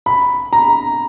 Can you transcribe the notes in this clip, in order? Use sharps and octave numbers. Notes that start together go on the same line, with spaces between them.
B5
A#5